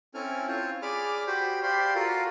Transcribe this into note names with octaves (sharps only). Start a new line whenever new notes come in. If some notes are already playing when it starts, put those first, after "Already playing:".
C4 C#4 E4 A4 G#5 F6
C4 F4 C5 C#5
G#4 D5 B5 D6 F6
F#4 G4 C5 G5 B5
G4 C5 D5 F5 B5 C6
F4 F#4 A4 A#4 F5